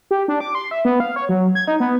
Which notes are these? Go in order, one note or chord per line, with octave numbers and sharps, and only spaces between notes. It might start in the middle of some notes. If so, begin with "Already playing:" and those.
G4
D4
D6
C6
E5
B3
F5
C#5
F#3
G#6
D#4
B3